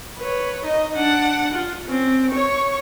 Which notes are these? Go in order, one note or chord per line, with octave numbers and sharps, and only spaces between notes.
B4 C#5
D#4 D#5
D4 F#5
F4
C4 C#4
C#5 C#6